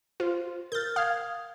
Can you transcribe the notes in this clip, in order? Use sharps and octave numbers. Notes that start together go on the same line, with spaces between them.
F4 C5
A#4 F6 G6 A6
F5 D#6 G#6